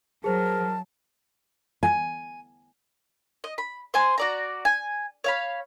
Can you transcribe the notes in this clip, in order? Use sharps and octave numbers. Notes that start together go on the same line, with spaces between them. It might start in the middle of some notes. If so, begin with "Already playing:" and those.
F#3 G#4 A#4 C5 A5
G#5
D#5
B5
C5 G#5 C6
F#4 D5 A#5
G#5
C#5 F5 B5